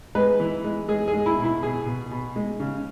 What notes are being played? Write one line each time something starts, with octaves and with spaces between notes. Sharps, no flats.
G#3 B4
E3
G#3
G#3 G#4
G#4
G#3
E4
B2
E4
B2 G#4
B2
B2
G#3
C#3